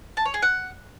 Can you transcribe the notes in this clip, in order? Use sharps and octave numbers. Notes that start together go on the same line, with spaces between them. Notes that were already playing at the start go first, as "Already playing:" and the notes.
A5
C#5
G#4
F#5